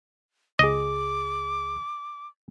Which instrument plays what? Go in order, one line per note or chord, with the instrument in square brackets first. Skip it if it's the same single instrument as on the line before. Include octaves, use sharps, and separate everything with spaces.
[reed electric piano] C#2 G#4 [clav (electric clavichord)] D#5 [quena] D6